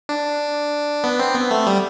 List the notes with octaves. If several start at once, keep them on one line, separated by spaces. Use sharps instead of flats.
D4
B3
C4
B3
A3
G3